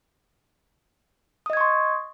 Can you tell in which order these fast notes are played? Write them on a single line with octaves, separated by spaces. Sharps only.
D#6 D#5 G#6 C#6 C6